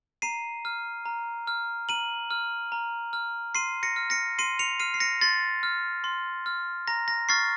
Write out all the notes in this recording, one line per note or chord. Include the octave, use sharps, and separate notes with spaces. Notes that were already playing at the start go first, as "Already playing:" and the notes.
A#5 C7 D#7
F6
A#5
F6
A#5 D#7 F#7
F6
A#5
F6
C6 C7 D#7
A#6 C#7
F6
A#6 C#7
C6 C7 D#7
C#7 F7
F6 C7 D#7
C7
A#6 C#7
C6 A6 C7
F6
C6
F6
A#5 A#6
A#6
C#6 F6 A6 C7